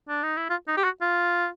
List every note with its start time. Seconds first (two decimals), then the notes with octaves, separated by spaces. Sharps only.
0.09 D4
0.23 D#4
0.37 E4
0.50 F4
0.67 D#4
0.77 G4
0.84 F#4
1.01 F4